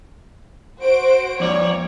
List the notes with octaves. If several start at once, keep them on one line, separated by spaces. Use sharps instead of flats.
F#4 C5 D7
F2 C#5 D5